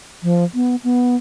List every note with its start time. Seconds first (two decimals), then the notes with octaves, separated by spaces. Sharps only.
0.23 F3
0.54 B3
0.84 B3